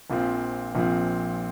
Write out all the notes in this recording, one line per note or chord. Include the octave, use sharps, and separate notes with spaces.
A#1 A#2 F3 C4
A#1 A#2 F3 C4